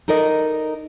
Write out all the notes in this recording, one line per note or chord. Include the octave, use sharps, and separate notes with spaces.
D#4 A4 A#4 D5 D#5